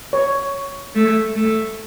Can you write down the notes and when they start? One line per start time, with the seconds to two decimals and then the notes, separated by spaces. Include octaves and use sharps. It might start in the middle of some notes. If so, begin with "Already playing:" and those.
0.13 C#5
0.95 A3
1.36 A3